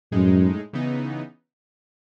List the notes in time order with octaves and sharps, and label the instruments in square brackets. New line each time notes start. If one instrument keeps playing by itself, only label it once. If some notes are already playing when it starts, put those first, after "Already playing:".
[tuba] F#2 [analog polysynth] A2 G#3 D#4
[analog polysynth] C#3 E3 B3 D#4